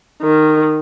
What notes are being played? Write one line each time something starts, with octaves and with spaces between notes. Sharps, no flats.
D#3